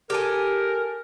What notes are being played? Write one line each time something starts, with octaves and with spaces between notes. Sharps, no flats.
G4 A4 A#4 G#5